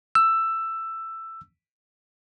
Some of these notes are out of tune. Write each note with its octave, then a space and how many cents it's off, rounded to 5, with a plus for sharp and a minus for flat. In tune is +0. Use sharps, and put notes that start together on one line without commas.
E6 +10